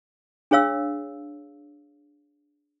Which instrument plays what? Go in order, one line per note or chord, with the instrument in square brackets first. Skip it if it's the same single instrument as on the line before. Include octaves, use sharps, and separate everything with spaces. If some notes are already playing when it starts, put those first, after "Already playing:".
[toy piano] D4 G#4 C#5 F5 E6